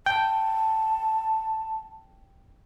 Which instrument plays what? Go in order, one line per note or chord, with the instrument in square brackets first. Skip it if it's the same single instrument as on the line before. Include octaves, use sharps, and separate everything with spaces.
[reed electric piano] G5 [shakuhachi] A5